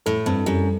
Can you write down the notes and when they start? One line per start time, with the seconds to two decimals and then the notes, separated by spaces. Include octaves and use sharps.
0.06 A2 A4
0.26 G2 C4
0.46 F#2 G3